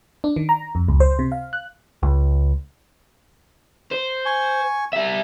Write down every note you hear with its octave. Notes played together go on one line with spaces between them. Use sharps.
D4
D#3
A#5
F2
C#2
C5
C3
F5
F#6
C#2
C5
G#5 C#6
G3 E5